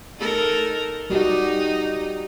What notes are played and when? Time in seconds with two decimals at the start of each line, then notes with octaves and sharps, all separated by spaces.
0.18 D#4 A4 A#4
1.10 G3 D#4 F#4 G4